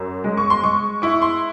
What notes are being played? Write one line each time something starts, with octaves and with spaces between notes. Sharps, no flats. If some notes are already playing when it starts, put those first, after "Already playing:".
Already playing: F#2
G#3
C#6
C6
G#3 C#6
E4 C#6
C6